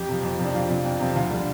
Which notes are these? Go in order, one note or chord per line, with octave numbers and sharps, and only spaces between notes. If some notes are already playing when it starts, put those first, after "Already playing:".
Already playing: F2 G4
C3 F3
F2
C3 F3
D4
F2 F4
C3 F3
F2
C3 F3
D2 F4
D3 G3